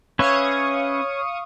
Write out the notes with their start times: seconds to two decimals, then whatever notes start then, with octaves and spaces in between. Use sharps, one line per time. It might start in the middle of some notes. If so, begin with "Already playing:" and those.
0.19 C#4 B4 C#5 E5 F5 C#6 D#6